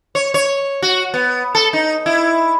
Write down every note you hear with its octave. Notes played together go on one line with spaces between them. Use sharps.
C#5
C#5
F#4
B3
A4
D#4
E4